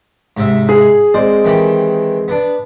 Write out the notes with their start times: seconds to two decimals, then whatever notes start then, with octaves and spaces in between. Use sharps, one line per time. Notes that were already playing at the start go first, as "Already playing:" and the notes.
0.37 G#2 C3 E5
0.69 G#4
1.14 G#3 C4 C5 D5
1.45 D#3 E3 G4
2.28 B3 D4